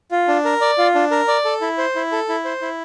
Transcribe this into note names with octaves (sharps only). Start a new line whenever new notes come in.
F4
D4
A#4
D5
F4
D4
A#4
D5
A4
E4
C5
E4
A4
E4
C5
E4